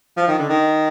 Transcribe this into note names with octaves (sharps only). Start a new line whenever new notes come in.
F3
D#3
D3
D#3